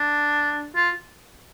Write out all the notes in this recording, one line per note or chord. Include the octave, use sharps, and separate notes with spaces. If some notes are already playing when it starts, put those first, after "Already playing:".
Already playing: D4
F4